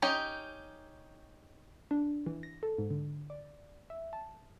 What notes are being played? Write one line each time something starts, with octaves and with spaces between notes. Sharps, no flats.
C#4 D#4 G4
D4
E3
A#6
A4
G#2
D3
D5
E5
A5